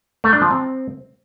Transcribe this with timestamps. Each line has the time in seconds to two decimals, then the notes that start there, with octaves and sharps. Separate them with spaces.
0.24 A3
0.33 D4
0.42 F3
0.51 C4